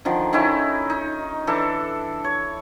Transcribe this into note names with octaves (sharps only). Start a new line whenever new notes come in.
D3 D#3 F3
D#3 C#4 D#4 E4
D#4
E3 D4 A4
C#5